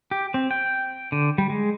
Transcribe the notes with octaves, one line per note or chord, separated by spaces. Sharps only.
G4
C4
G5
D3
G3
G#3